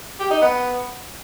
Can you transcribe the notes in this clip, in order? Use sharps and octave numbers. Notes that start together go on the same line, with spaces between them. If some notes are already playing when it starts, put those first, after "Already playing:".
G4
D#4
B3